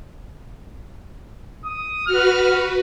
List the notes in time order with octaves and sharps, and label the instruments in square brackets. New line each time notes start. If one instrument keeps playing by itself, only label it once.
[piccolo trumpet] D#6
[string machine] F#4 B4 [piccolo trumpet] F6